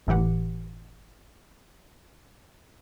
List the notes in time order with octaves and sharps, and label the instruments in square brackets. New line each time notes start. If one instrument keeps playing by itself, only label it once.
[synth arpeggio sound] G1 A2 E3 G4 F#5